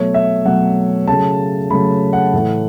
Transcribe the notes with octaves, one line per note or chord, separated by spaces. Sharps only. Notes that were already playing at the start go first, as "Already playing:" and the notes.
Already playing: B2 F#3 A3 C#5
E5
B2 F#3 A3 F#5
C#3 F#3 A3 A5
C#3 F#3 A3 B5
F#5
A2 E3 A3